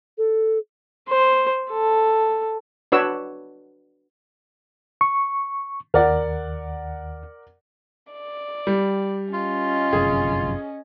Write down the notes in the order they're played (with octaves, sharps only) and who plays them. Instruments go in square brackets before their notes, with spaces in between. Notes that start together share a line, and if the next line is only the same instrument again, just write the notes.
[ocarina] A4
[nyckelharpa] C5
A4
[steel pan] D4 F#4 B4 C#5 E6
[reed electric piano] C#6
[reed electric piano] D#2 [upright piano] A#4 D5 F#5
[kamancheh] D5
[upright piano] G3
[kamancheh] C#4 D#5 [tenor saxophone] F4
[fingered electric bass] G1 F#2 C3 [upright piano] G#4